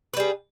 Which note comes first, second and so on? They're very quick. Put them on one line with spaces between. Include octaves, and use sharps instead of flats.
B4 G3 G#4